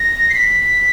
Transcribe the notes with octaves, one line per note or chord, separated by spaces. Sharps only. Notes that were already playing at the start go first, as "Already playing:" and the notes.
Already playing: A#6
C7
B6